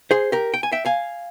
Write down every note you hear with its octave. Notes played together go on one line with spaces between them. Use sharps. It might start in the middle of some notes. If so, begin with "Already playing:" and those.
G#4 C5
G4 A#4
G5
G#5
E5 G5
F5 G#5